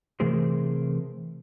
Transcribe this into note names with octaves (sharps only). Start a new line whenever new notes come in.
C3 E3 A3 G#4 A#4 C5